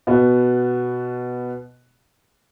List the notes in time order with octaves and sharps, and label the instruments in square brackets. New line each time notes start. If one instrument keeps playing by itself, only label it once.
[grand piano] B2 B3